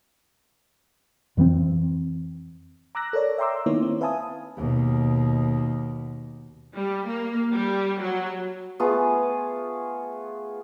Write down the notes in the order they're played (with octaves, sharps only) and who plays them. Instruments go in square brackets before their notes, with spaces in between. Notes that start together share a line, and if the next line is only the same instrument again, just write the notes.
[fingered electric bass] F2 E3 A#3 C4
[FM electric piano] A#5 D6 E6 F#6 A#6
A4 A#4 C#5 D5
E5 G5 A#5 C6 D6 E6
D#3 A#3 B3 D#4 E4 C#5
C4
B4 E5 F5 G#5 A5 D#6
[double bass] D#2 B2
[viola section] G3
A#3
G3
F#3
[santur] A3 B3 F4 G#4